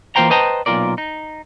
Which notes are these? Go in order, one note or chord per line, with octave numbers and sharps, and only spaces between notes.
E3 A#3 F4 C5 G5 A#5
B4 C5 D#5 G5 A5 A#5
B1 A#2 C4 F4 A#4 D5
D#4